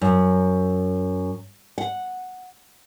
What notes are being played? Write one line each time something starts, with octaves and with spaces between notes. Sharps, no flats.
F#2
F#5